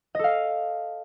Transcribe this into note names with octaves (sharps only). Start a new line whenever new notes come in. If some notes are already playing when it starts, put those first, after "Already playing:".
A4 D#5 F5